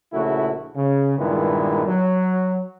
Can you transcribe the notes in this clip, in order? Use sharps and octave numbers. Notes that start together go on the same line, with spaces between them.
A#1 C#3 A3 E4 F#4
C#3
G2 A#2 D#3 G#3 B3 E4
F#3